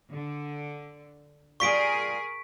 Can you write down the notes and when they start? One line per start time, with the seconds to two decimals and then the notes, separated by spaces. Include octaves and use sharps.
0.12 D3
1.60 G3 F4 G#4 A#4 C#6 B6 D7